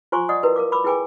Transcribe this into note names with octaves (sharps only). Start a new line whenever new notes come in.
F4 C5 G#5 C6 C#6
D5 D#5 F#5 D#6
E4 F#4 A#4 B4
A#4 F5 D6
B5 D6 E6
E4 G#4 B4 G5 G#5 D6